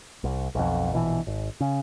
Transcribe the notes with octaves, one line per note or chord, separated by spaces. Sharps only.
C2
B1 F2
A#1 B2 D#3 E3
G#1
C#3